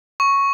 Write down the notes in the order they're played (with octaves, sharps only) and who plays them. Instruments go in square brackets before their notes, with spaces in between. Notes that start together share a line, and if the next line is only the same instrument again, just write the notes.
[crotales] C#6